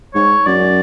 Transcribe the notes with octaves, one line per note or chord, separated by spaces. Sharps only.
G#2 C#5
F#2 D5